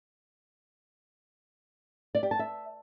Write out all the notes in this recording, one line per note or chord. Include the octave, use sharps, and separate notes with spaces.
D5
G4
A5
E5